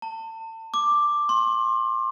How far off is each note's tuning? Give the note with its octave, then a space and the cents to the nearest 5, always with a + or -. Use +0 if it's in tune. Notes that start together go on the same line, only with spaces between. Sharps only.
A5 +35
D6 +5
C6 +30